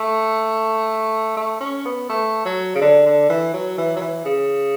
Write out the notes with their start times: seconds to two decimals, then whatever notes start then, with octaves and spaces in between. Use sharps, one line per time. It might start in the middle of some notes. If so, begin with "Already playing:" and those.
Already playing: A3
1.37 A3
1.60 C#4
1.85 B3
2.09 A3
2.45 F#3
2.75 C#3
2.81 D3
3.06 D3
3.29 E3
3.54 F#3
3.78 E3
3.96 F#3
4.02 E3
4.25 C#3